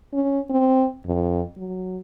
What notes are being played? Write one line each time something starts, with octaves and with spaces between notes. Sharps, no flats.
C#4
C4
F2
F#3